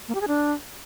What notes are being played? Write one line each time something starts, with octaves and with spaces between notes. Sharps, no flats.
A#3
G4
G#4
D4